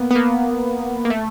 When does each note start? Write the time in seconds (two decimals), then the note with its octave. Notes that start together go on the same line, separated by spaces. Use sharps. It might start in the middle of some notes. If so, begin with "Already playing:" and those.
Already playing: A#3 B3
0.11 B3
0.15 A#3
1.05 A#3
1.10 A3